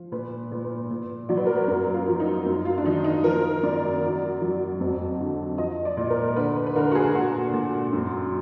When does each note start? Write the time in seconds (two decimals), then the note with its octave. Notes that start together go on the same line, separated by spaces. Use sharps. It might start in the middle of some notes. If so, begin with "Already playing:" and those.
Already playing: F3
0.12 A#2 B4
0.52 A#2
0.64 B4
0.91 A#2
1.29 F#3 D5
1.37 B4
1.46 A#4
1.55 B4
1.68 F#2 A#4
1.94 F4
2.07 F3
2.20 D#4
2.46 F#2
2.65 F4
2.78 D4
2.85 D#3 D#4
3.04 D#4
3.24 F3 A#4
3.63 F#2 D5
4.03 F#3
4.41 F#3
4.80 F2
5.20 D3
5.58 F3 D#5
5.85 D5
5.97 A#2
6.10 A#4
6.36 D3 B4
6.56 B4
6.67 B4
6.76 D3 A#4
6.91 F#4
6.95 G#4
7.14 A#2 F#4
7.53 A#2
7.93 F#2